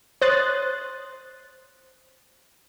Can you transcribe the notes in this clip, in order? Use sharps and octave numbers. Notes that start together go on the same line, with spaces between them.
C5 C#5 C6 D#6 F#6 A6